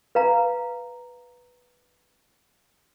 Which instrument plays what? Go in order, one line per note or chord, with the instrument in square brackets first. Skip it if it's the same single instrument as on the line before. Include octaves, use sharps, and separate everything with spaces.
[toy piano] B4 F5 A#5